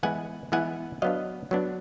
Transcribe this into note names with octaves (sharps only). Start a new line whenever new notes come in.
E3 G#3 B3 E4 F#5 G#5
E3 G#3 B3 E4 F#5 G#5
F#3 B3 D4 D#5 F5
F#3 B3 D4